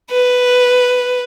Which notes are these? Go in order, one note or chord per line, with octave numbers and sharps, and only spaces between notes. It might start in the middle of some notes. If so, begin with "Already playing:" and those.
B4